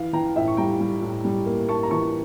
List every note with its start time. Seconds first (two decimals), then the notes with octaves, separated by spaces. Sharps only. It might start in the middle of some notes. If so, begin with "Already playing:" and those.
Already playing: E3 F5
0.13 E3 G5 A#5
0.36 A2 E5 G5
0.48 C#6
0.57 G3 G5 A#5
0.80 G3
1.02 A2
1.24 G3
1.46 A#3
1.68 A#3 A5 C#6
1.83 A#5
1.91 E3 A5 C#6